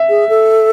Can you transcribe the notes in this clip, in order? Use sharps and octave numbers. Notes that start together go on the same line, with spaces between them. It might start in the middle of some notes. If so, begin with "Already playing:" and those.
Already playing: E5
G#4
A4